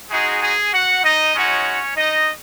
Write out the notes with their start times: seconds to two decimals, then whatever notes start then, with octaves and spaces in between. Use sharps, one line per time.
0.10 G#3 D#4 F#4 G#4
0.41 G#4 G#5
0.72 F#4 F#5
1.03 D#4 D#5
1.35 G#3 C#4 D#4 F#4 C#5
1.96 D#4 D#5